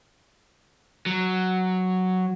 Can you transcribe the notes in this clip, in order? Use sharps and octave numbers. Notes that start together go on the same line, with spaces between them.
F#3